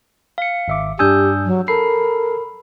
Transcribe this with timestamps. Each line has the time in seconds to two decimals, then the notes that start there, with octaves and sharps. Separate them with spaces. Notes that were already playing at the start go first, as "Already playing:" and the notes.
0.38 F5 C#7
0.68 G#1 E5 D6
0.99 G2 D4 G4 G#5 D#6 E6 G6
1.46 F#3
1.68 A4 A#4 B5 C7